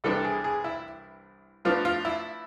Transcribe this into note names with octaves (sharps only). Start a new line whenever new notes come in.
C2 C3 E3 B3 D4 A4
G#4
G#4
E4
A2 F3 B3 D4 F4
F4
E4